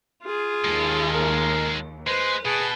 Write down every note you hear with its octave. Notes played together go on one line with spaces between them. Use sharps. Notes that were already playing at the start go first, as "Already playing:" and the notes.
F4 G#4
D#2 G#3 A4
A#4
G#3 B4 C5
B2 G#4 B4 A5